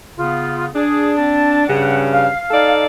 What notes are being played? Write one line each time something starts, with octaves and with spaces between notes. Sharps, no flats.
C#3 B3 F4
D4 G#4
C4 A5
G2 C#3 F#5
F5
D#4 A4 D5